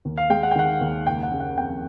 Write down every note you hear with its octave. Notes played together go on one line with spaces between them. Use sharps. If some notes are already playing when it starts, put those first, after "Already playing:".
D#2
F5
G#3 G5
F#5
G5
D#3 F#5
D#2
F#1 G5
F#5
C#3
F#5
F2 G5